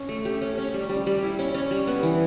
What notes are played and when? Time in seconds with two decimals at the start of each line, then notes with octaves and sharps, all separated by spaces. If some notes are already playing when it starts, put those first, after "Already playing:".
Already playing: C#4
0.09 A3
0.25 G4
0.42 C#4
0.58 C#4
0.74 G3
0.89 G3
1.06 G3
1.22 E4
1.39 C#4
1.54 C#4
1.71 G3
1.87 B3
2.03 E3